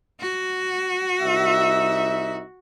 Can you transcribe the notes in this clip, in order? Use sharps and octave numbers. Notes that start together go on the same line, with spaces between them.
F#4
C2 D#4 E5